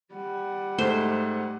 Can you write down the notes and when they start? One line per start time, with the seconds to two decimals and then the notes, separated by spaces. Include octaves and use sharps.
0.14 G3 F#5
0.78 G#2 A3 C5